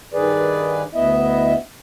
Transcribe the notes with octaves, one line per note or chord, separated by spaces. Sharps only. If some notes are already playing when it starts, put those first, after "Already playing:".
G2 D#3 G#4 B4 D5
D2 B3 E4 D#5 E5